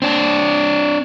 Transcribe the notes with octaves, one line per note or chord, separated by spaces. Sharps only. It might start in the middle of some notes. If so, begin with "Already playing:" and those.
C4 D4